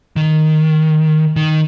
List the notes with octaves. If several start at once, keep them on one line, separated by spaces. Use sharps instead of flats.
D#3
D#3